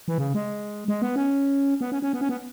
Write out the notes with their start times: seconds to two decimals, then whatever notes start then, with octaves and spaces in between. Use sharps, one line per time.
0.08 E3
0.18 C#3
0.34 G#3
0.88 G#3
1.02 B3
1.16 C#4
1.81 B3
1.92 C#4
2.02 C#4
2.13 B3
2.21 C#4
2.29 B3